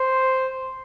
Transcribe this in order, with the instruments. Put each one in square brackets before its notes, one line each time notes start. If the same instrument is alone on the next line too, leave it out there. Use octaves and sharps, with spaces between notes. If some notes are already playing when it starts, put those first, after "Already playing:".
Already playing: [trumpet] C5